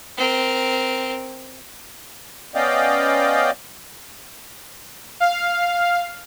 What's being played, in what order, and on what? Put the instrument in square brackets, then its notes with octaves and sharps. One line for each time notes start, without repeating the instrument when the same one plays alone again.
[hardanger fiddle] C4 A#4
[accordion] B3 C#4 D5 D#5 F5 G5
[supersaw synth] F5